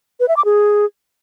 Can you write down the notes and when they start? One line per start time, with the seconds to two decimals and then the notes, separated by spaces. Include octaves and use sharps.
0.20 B4
0.28 E5
0.37 D6
0.45 G#4